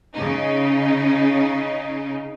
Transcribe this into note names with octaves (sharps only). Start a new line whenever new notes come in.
C#3 D#4